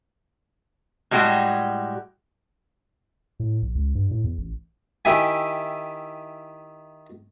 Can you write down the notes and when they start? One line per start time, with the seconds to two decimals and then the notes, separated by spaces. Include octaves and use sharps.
1.11 A2 G3 G#3 F#4 G4
3.40 A2
3.62 A#1
3.75 C#2
3.95 G2
4.11 A2
4.24 E2
4.38 A1
5.05 D#3 E4 G4 G#5